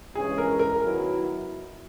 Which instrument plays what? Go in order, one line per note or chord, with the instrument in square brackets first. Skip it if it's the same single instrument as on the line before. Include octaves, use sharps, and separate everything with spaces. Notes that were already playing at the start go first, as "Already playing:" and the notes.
[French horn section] G2 E3 G#3 C#4 [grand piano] G#4
[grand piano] A#4
A#4
[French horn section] D#3 F#3 B3 E4